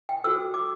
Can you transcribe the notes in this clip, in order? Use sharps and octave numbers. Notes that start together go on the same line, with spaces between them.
G5
F#4 A4 C5 E6
D6